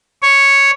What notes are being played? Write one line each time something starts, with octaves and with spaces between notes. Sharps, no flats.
C#5